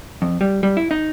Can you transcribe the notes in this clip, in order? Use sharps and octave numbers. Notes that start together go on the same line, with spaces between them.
F2
G3
G3
E4
D#4